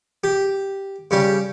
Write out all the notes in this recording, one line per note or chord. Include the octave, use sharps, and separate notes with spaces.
G4
C#3 G3 G4